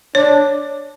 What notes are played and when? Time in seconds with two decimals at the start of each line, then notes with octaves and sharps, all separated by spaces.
0.15 D4 C#5